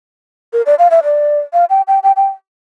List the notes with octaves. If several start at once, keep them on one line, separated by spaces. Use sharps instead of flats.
A#4
D5
F5
E5
D5
F5
G5
G5
G5
G5